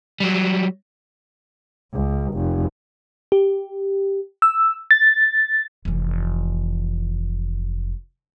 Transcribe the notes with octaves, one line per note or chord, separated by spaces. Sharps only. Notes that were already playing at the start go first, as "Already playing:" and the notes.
F#3 G3
C#2
F1
G4
E6
A6
F1 E3